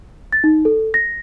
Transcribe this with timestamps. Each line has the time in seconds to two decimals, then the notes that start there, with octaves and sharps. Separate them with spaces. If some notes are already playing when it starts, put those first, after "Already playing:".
0.33 A6
0.44 D#4
0.65 A4
0.94 A#6